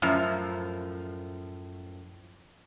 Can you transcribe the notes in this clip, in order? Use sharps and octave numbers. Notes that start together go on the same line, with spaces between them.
F#2 A2 F3